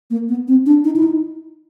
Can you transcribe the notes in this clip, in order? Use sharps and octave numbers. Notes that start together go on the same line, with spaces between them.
A#3
B3
C4
D4
D#4
E4
D#4